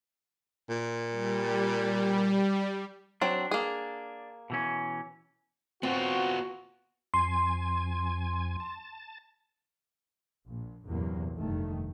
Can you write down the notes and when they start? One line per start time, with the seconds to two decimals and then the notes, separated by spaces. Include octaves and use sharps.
0.69 A#2
1.11 G3
3.22 F#3 C4 D4
3.51 A#3 G#4
4.50 B2 E3 C#4
5.83 B3 C4 F4 F#4
7.14 F2 G#5 C6
8.60 A5
10.48 A#1 A#2
10.87 A#1 E2 G2 C3 F#3 A#3
11.37 F1 G2 D#3 A3